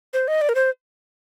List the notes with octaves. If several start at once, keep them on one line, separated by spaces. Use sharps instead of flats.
C5
D#5
D5
A#4
C5